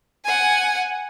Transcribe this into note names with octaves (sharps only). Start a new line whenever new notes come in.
F#5 G#5